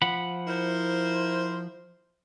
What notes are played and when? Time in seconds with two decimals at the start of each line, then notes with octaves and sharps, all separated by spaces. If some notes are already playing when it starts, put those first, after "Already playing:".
0.02 F3 F#5 B5
0.46 E4 A#4 C5